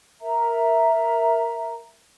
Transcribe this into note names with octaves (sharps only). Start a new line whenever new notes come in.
A#4 E5 A#5